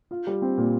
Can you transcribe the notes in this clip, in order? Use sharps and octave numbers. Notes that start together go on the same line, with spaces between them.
F4
G3
C4
A#2